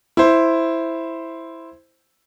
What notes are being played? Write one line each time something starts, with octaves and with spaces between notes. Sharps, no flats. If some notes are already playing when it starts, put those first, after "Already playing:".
E4 C5